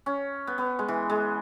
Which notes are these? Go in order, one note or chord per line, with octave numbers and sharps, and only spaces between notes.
C#4
B3
B3
G#3
E3
G#3